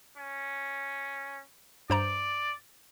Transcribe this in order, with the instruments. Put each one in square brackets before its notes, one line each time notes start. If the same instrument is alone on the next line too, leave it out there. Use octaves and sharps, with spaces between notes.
[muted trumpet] C#4
[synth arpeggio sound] G2 C5 A#5 [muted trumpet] D5